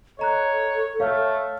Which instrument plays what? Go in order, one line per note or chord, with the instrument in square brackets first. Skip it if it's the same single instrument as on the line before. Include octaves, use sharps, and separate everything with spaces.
[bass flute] A4 [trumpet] C#5 [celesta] D#5 A#5 F#6
[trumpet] A3 [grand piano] C#5 [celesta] F5 F6